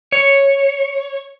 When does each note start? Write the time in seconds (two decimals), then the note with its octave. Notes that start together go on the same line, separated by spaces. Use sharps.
0.12 C#5